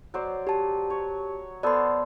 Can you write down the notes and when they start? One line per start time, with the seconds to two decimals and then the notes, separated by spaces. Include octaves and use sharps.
0.14 F#3 C5 D5
0.47 G4 A5
0.90 C#5
1.63 B3 A4 C5 D5 C6